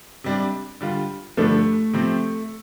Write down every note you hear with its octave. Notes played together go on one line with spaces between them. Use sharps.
C3 G3 D4
D3 G3 F4
G2 D3 F3 A3 D4
C3 F3 C4